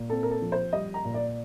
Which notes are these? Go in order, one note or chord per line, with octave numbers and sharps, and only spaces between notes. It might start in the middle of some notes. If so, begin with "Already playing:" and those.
Already playing: A#2
C4 A4
A#4
A4
F3
C5
G3 D#5
A#5
A#2
D5